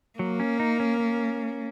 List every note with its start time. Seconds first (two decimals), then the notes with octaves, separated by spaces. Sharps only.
0.19 F#3 A#3
0.40 C#4
0.60 D#4
0.80 C#4
1.00 C#4